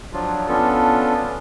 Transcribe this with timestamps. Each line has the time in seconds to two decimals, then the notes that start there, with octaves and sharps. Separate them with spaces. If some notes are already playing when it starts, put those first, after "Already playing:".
0.13 F3 F#3 D4 F4
0.48 B3 C#4 D4 F4 A4